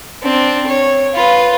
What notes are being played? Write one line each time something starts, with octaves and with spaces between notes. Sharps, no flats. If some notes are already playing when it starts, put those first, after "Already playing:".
C4 D4
C#5
F4 B4